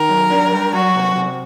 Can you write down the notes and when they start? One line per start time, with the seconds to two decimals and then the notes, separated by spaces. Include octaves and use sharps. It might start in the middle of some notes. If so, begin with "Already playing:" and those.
Already playing: D#3 A#4
0.09 F#2
0.31 D4
0.52 G3
0.73 F#3 F#4
0.95 C3
1.16 C3